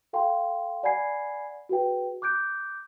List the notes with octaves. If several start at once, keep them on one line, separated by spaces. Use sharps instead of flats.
A4 F5 G5 C6
D5 F#5 G#5 B5 G#6 C7
F#4 G#4 B4 G5
D6 F#6 G6 D7